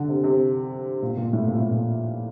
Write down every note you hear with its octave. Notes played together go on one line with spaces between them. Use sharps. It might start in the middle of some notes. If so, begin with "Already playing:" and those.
Already playing: D3
C3
C3
A#2
A#2
A2
A#2
A2
A#2